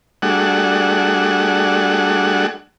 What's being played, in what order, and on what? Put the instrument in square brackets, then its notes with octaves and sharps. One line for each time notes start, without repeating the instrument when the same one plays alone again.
[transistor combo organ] G3 A3 D4 F#4 G#4 F#5